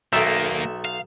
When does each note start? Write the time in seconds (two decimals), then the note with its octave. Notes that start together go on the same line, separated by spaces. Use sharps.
0.13 B1 D#3 A#3 A4 E5
0.85 F5